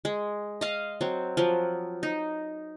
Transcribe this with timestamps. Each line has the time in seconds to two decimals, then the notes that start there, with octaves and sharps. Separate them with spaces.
0.05 G#3
0.61 D#5 F5
1.01 F#3 C4
1.37 F3 F#3
2.03 D#4